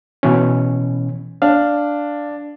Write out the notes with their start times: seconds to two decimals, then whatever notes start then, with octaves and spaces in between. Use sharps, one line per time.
0.23 B2 E3 C#4
1.42 D4 F5